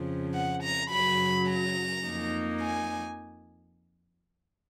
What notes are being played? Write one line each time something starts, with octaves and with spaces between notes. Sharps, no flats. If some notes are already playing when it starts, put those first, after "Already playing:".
Already playing: F2 C#3 F3
F#5
A#5
F#2 C#3 F#3 B5
A#5
F2 F3 A#3 D#4
G#5